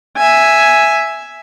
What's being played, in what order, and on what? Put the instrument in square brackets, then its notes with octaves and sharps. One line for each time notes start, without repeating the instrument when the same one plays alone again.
[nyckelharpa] E5 G#5